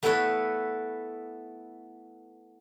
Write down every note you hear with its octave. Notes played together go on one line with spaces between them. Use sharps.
A3 B3 E4 A4 B4 C#5